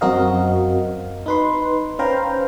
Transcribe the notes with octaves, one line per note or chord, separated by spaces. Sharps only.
F#2 C4 F#4 A#4 D#5 F5
D#4 B4 C6
C#4 B4 C5 F5 G5 A#5